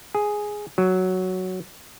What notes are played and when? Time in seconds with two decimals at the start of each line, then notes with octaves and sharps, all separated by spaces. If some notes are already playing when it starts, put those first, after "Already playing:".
0.15 G#4
0.78 F#3